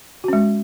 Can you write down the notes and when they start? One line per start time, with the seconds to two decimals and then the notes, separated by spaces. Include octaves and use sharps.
0.24 F#4
0.28 C#4
0.33 G#3